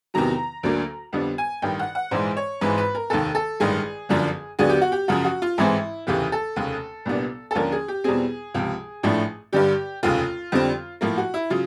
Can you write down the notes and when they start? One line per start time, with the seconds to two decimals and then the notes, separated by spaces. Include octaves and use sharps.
0.14 E2 C3 D#3 F#3 A#5
0.63 D2 D3 F#3 A#3 D4
1.13 F2 D3 G3 B3 D4
1.38 G#5
1.62 A1 G2 D#3 G5
1.79 F#5
1.95 F#5
2.11 A#1 G#2 E3 G#3 C5
2.37 C#5
2.61 G#1 G#2 E3 G#3 B4
2.78 B4
2.95 A#4
3.10 F1 D#2 D#3 A4
3.35 A4
3.60 A1 G2 D#3 G#3 G#4
4.09 G1 F#2 D3 F3
4.59 D#2 D3 F#3 B3 G#4
4.69 G4
4.82 F#4
4.92 G4
5.08 F#2 C#3 F3 F#4
5.25 F#4
5.42 F4
5.58 A1 G#2 E3 G#3 C4 E4
6.07 F1 D#2 C#3 E3 G4
6.32 A4
6.56 F1 D#2 C#3
7.06 C2 A#2 G3 B3 D4
7.51 A4
7.55 D#2 D3 F3 A#3 C#4 A#4
7.72 G#4
7.88 G4
8.04 E2 B2 G3 C4 G#4
8.54 C#2 C3 F3
9.03 A1 A2 F3 A3 D4
9.53 G2 D3 G3 G4
10.03 F1 D#2 C#3 F4
10.52 F2 D3 G3 C4
11.01 A2 F3 A#3 F4
11.18 F#4
11.34 E4
11.50 C#3 F#3 F4